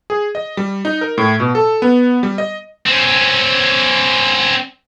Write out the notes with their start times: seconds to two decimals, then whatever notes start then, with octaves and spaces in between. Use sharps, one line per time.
0.10 G#4
0.35 D#5
0.57 G3
0.85 D#4
1.01 A#4
1.18 A2
1.40 B2
1.55 A4
1.82 B3
2.23 G3
2.38 D#5
2.87 C4 C#4